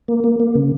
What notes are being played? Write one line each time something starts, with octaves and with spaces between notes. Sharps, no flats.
A#3
A#3
A#3
C#3